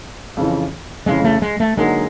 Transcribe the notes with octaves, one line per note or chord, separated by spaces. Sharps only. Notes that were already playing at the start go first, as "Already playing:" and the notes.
F2 C#3 E3
F2 C#3 E3 G#3
A3
G#3
A3
D3 F#3 G#3 A#3 D#4